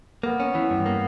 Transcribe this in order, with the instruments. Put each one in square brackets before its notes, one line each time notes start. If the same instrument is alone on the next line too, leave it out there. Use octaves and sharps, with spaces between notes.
[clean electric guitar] A#3 [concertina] B3
[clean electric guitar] C#4
E3
G2
A#3